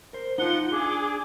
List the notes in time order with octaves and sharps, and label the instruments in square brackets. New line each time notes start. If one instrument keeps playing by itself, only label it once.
[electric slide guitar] A#4 C5
[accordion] F3 F#5 [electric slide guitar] D#4 F4 [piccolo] G7
[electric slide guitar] D4 [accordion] G#4 [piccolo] D6